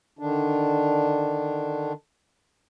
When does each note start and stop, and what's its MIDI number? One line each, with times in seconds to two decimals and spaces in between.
0.19 1.93 50
0.19 1.93 51
0.19 1.93 62